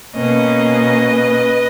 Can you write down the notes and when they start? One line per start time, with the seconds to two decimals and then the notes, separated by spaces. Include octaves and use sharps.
0.15 B2 A#3 C#4 B4 D#5